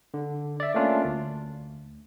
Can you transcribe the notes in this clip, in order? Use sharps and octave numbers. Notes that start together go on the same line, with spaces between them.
D3
D5 E5
A3 A#3 C#4 D4 F4
D2